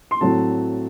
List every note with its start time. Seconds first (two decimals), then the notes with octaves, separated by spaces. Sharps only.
0.11 C6
0.21 A2 F#3 A3 C4 A5